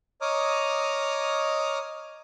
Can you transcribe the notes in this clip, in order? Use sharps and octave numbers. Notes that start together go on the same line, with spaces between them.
C#5 D#5 A#5 D6 D#6 F6